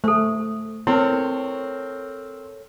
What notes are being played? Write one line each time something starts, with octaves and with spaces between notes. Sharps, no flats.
A3 A4 C5
C4 E4 A4 A#4 C#5